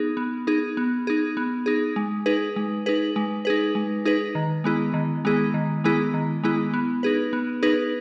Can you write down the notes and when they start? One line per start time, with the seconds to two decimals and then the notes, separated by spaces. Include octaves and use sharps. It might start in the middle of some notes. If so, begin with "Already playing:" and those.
Already playing: B3 D#4 G#4
0.17 B3
0.47 D#4 G#4
0.77 B3
1.07 D#4 G#4
1.37 B3
1.66 D#4 G#4
1.96 G#3
2.26 D#4 G#4 B4
2.56 G#3
2.86 D#4 G#4 B4
3.16 G#3
3.45 D#4 G#4 B4
3.75 G#3
4.05 D#4 G#4 B4
4.35 D#3
4.64 G#3 B3 E4 G#4
4.94 D#3
5.25 G#3 B3 E4 G#4
5.54 D#3
5.84 G#3 B3 E4 G#4
6.14 D#3
6.44 G#3 B3 E4 G#4
6.74 B3
7.03 D#4 G#4 B4
7.33 B3
7.63 D#4 G#4 B4